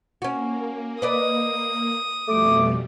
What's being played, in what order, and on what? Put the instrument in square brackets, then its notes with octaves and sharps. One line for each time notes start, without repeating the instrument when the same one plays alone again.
[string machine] A#3 [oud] C#4 F#4
[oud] B4 D5 D#5 [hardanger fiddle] D#6
[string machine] F2 B2 G3 [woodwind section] A3 D6